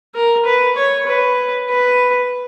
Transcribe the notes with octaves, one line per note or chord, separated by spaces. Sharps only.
A#4
B4
C#5
B4
B4